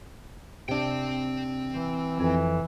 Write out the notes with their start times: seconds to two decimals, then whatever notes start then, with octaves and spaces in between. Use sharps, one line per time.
0.69 C3 C4 D4 G5
1.69 E3
2.20 F2 E3 G#5